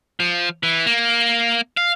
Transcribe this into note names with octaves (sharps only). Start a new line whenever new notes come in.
F3
E3
A#3
F5